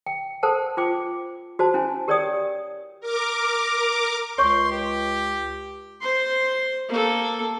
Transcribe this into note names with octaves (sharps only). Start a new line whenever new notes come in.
G5
A4 A#4 C5 F#5 A5
F4 C5 G5 D6
F#4 C5 A5
C#4 E4 G#5
G4 A#4 C#5 D5 G5 D#6
A#4 D6
C#2 C#5 C6 C#6
G4
C5 C6
A#3 A4